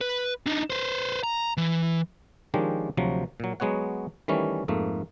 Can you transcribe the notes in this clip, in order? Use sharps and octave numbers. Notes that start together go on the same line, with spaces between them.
B4
D4 D#4
B4 C5
A#5
E3
D#3 F3 G#3 C#4 D4 G4
D2 C3 F3 F#3
A#2 F#3
F#3 G#3 B3 C#5 F#5
D#3 E3 G3 A3 C#4
F2 G#2 A3 A#3